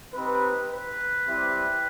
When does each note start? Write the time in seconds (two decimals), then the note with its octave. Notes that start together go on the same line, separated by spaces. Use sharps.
0.13 C4 D#4 G4 B4
0.69 B4
1.26 G3 C4 E4 G4